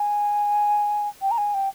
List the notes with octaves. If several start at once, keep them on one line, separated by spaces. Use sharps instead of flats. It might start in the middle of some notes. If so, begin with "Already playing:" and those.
Already playing: G#5
G5
A#5
G#5
G5